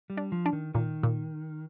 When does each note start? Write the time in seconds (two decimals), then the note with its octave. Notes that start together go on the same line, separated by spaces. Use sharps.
0.10 G3
0.17 D4
0.32 F3
0.46 D4
0.53 D#3
0.74 A#2 D#3
1.03 A#2